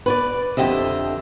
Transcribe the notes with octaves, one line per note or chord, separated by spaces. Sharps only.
B4 C#5 D5
F2 D3 G4 D#5 E5